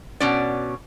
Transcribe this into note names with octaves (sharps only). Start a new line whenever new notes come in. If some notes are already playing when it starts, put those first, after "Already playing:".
B2 C#4 D5